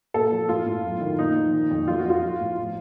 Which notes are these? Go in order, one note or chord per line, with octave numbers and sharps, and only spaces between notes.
A#2 A4
F3
A2 F4
A2
F#2
D#3
A#2 D#4
F3
D#3
F2
F2 F4
F#4
F2 F4
F3
A2
F3